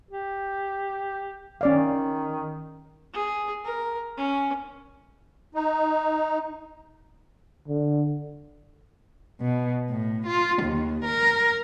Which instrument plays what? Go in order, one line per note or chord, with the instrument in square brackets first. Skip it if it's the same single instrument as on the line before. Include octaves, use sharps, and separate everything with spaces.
[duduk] G4
[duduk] D#3 [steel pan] C#4 D5 F5
[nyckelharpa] G#4
A#4
C#4
[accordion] D#4
[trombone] D3
[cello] B2
A2
F4
D#2
A#4